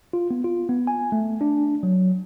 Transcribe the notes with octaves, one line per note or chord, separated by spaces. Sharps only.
F4
B3
F4
B3
G#5
A3
D4
F#3